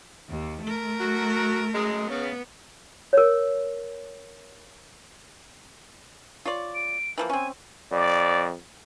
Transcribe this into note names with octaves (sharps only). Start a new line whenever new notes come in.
D#2
A3 A#4
F#3 F#4
F#2 G#3
C#3 B3
A#4 C#5
F4 C#5 D5
D7
E3 F3 A#3
C4 C#4 G#5
F2 D5